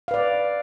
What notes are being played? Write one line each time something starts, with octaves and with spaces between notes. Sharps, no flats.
B4 D5 F5